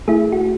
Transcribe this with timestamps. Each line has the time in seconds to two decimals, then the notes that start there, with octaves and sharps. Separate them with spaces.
0.08 A3 E4 G#4
0.32 F#4